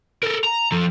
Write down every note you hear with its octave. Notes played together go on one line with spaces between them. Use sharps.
A4 A#4
A#5
F3 A4